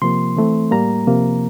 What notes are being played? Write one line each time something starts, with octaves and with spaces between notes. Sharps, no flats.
C3 F3 A#3 C6
E3 A3 C4
A2 G3 A#3 A#5
C3 F3 A#3